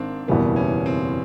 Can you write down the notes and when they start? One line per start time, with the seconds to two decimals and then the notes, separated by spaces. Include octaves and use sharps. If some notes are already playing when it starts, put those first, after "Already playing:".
Already playing: G#1 G#2 D#3 C4 D4
0.28 F#1 E2 B2 G3 A#3 B3
0.56 C#4
0.86 C4